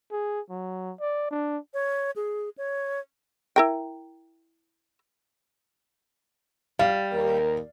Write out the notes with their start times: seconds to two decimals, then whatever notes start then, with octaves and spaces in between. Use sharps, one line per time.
0.11 G#4
0.50 F#3
1.00 D5
1.31 D4
1.74 C#5
2.16 G#4
2.58 C#5
3.56 E4 A#4 G5
6.79 G3 F5
7.13 D#2 A#4